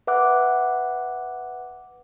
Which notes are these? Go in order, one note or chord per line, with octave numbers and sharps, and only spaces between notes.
B4 E5 F#5 D6 F#6